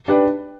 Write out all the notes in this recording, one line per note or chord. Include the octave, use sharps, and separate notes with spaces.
D4 G4 B4 D5